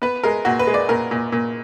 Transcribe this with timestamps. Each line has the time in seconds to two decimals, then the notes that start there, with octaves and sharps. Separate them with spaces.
0.02 B3 B4
0.24 G#3 A#4
0.45 A#2 F#4
0.59 B4
0.67 G#3
0.74 D5
0.89 A#2 A#4
1.11 A#2
1.32 A#2